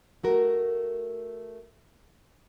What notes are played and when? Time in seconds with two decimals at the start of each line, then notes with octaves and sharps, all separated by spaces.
0.23 A3 F#4 A#4